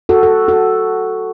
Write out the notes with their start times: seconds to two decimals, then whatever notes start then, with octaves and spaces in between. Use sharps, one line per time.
0.09 F#4 A4
0.23 A4
0.48 F#4 A4